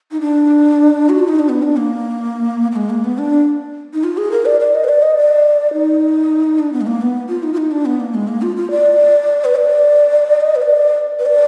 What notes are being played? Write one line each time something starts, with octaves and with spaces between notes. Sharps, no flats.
D#4
D4
F#4
F4
D#4
D4
B3
D4
A#3
A#3
G#3
A#3
B3
D4
D#4
F4
G#4
A#4
D5
D5
D#5
B4
D5
D#5
D5
D#4
D4
B3
G#3
A#3
B3
F4
D#4
F4
D#4
D4
B3
A#3
G#3
A#3
F4
F4
D5
B4
D5
D#5
B4
D5
B4
D5